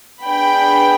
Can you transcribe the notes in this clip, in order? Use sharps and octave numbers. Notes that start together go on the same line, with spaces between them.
B3 D4 G#4 G5 B5